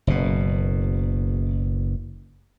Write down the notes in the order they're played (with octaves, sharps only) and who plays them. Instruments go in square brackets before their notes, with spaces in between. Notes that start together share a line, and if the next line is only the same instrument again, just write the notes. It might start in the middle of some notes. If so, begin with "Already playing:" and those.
[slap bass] F#1 B2